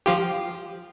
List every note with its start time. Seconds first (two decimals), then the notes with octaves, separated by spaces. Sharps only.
0.06 F3 F4 G4